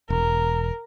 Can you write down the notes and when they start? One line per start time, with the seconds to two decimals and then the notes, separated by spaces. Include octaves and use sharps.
0.10 E1 A#4